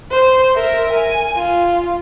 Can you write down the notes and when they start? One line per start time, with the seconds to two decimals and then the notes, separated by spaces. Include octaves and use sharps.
0.11 C5
0.55 A#4 E5
0.93 G#5
1.37 F4